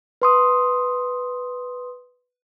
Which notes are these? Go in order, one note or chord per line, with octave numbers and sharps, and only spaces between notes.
B4 C6 D#6